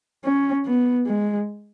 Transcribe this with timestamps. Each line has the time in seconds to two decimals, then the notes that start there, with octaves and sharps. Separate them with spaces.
0.25 C#4
0.66 B3
1.07 G#3